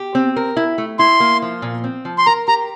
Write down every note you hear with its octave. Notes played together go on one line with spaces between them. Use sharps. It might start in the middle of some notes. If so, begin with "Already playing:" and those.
Already playing: G4
C4
A#4
E4
A3
E4 C6
A#3
F3
A#2
C4
F3
C6
A#4 A#5
G4 A#5